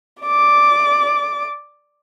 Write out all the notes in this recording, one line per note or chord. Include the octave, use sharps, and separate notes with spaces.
D5 D6